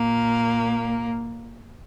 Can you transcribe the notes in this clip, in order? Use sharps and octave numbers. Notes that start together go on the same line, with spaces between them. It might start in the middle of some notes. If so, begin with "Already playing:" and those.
Already playing: A#2 A#3